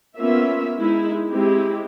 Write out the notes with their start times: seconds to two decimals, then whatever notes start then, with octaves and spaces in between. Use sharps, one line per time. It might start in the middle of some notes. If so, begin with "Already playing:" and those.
0.17 A#3 B3 C#4 F4 E5
0.77 G#3 D#4 E4
1.31 G#3 C4 E4 G4